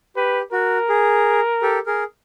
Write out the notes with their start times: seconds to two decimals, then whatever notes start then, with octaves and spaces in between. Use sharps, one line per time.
0.16 G4 B4
0.53 F#4 A#4
0.89 G#4
1.62 G4 A4
1.86 G#4 A#4